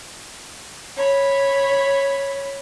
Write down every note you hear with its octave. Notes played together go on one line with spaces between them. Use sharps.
C#5 B5